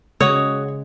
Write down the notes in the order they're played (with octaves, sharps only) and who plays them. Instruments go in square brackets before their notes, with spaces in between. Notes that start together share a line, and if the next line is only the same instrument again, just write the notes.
[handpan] C#3 G#3 [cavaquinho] F#4 D#6 [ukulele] C#5